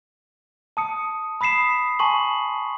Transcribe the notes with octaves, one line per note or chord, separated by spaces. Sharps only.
A5 D#6 C#7
B5 D#6 B6 C7 E7
G#5 A5 C6 C#6 F#7